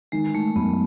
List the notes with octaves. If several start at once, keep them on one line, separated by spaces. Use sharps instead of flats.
D#3 G#3
D#3 A3
F#2 B3